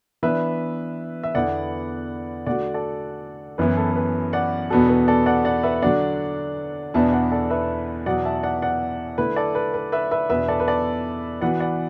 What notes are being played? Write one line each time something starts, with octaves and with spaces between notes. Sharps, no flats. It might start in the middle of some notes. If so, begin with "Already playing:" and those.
E3 B3 D4 B4 E5
E5
E2 D3 B3 E4 D5 F#5
D3 A3 F#4 D5 F#5
A4 D5
F#2 E3 B3 E4 B4
A4
A4
B4
D5 F#5
E2 B2 B3 D4 F#4 A4
B4
A4 D5
D5 F#5
D5 F#5
B4 E5
D3 F#3 D4 D5 F#5
E2 B2 B3 D4 E5 A5
D5 F#5
A4 D5
B4 E5
E2 B2 F#3 D5 F#5
E5 A5
D5 F#5
D5 F#5
D3 A3 E4 B4
A4 D5
B4
B4
B4 E5
B4 E5
E2 B2 B3 D4 B4 E5
A4 D5
B4
A4 D5
E3 B3 F#4 D5 F#5
D5 F#5